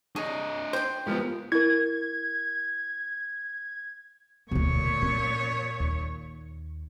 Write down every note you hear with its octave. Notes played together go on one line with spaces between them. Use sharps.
D4 G#4 C#5 D#5
C5 G5 C6
G#2 F3 B3 F4 G4 A#4
E4 A#4 G#6
E1 D2 A#2 C#5
C#4
D#2